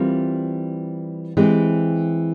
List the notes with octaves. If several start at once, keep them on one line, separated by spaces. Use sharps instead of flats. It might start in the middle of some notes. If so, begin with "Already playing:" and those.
Already playing: E3 G3 C4 F4 A#4
E3 G#3 C4 G4